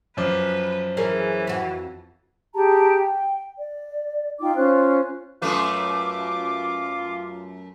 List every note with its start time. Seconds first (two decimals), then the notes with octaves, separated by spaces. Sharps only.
0.17 F#2 F3 B4 D6
0.97 E3 C#4 G#4 A#4
1.47 F2 F#4
2.54 G4 G#4 A5 A#5
2.97 G5
3.59 D5
4.39 D#4 F4 G5 D6
4.55 C#4 F4 C5 F#6
5.42 F#2 A3 F4 B4 D6